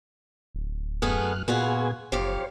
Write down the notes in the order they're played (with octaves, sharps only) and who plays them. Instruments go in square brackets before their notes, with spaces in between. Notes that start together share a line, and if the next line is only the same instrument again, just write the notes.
[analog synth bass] D1
[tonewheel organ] F#2 F6 F#6 [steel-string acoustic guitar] A3 B3 G#4
[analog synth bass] A#2 [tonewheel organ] B3 G#4 G#5 [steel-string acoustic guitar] F4 F#4 B4
[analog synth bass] F#1 [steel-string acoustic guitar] F2 G4 F5 [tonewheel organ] C5 C#5